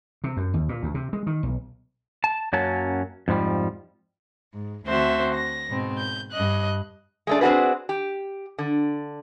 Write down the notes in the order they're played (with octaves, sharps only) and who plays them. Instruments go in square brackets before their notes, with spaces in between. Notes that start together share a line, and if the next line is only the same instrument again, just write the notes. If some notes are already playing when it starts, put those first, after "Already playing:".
[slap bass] C3
F#2
D#2
A#2
D2
C3
G#3
D#3
B1
[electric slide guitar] A5
F#2 F#3 A#3 C#4 A5
F2 G#2 F3 G3
[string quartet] G#2
D2 D3 C4 F#4 C5 E5
A#6
G#2 B2 C4
G6
G2 D#5 F#6
[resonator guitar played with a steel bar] G#3 A3 D4
C4 D4 D#4 F#4 G#4 B4
G4
D3